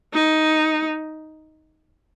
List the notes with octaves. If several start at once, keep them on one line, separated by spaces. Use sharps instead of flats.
D#4